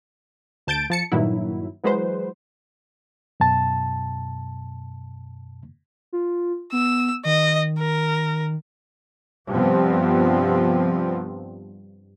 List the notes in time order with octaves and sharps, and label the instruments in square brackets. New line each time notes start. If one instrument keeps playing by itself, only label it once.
[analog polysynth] D2 A5 G6 A6 D7
F3 A5 C#7
G2 A#2 D#3 F#3 E4
E3 F#3 G#3 B4 C5
[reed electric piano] F#2 B2 A5
[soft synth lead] F4
[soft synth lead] B3 [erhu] E6
[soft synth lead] D#3 [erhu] D#5
[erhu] A#4
[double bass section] G2 C3 F3 B3 C4